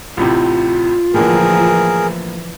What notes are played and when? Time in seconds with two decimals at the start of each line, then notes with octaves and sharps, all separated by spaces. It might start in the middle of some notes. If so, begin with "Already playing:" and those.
0.17 A1 A2 C3 F4
1.14 A2 D3 E3 F3 A#3 G#4 A#4